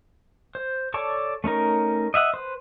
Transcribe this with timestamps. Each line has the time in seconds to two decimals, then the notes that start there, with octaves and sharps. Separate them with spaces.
0.55 C5
0.94 A4 C#5 D5 A5 C#6
1.44 A3 C#4 D#4 A#4
2.14 D#5 E5 F#5 D#6
2.34 B4 C5